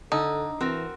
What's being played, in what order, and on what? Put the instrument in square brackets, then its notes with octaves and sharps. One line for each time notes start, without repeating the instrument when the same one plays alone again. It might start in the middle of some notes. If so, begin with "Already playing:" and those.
[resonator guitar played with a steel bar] D3 [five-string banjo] D#4 [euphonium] A4
[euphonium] E3 [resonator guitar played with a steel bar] C4 F#4 A#4